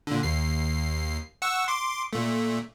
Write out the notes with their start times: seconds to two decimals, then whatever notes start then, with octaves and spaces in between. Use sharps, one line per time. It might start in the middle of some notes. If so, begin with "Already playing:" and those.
0.07 A#2 D3
0.23 D#2 C7
1.42 F#5 C#6 E6
1.68 C6 D6
2.13 A#2 A3